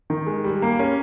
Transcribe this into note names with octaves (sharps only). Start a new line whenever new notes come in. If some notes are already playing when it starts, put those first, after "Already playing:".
D#3
G#3
G3
A#3
C#4